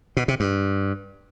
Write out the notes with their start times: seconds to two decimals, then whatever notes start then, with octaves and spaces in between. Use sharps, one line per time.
0.17 B2
0.28 C3
0.40 G2